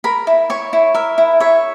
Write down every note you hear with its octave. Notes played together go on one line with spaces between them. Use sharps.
A#4 B5
E4
C#5 C#6
E4
A#4 E5
E4
C#5 E5